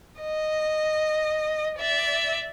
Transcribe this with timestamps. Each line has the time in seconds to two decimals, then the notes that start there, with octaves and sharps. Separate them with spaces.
0.21 D#5
1.79 D5 E5